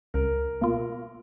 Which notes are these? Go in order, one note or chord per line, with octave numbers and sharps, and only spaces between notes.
C#2 A#4
B2 A#3 F4